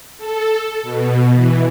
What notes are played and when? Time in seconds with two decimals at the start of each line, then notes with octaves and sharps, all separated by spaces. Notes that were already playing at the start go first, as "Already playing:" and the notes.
0.18 A4
0.83 B2
1.34 E3